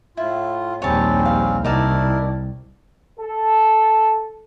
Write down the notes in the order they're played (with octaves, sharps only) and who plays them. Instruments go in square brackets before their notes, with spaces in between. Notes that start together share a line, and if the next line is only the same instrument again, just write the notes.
[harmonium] A2 F4 [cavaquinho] E4
[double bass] A#1 D#2 [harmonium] G3 C4 C#4 [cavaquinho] C#5 A5
[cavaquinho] F5
[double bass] C2 [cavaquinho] D#4 D5 A5 [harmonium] E4 A#4
[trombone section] A4